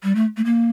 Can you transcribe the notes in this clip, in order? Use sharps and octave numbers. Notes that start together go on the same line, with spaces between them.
G3
A3
A3
A#3